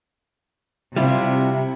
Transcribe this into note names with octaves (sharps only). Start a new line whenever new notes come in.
C3 G3 E4 F4